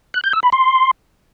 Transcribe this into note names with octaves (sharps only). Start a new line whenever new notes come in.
F#6
G6
E6
B5
C6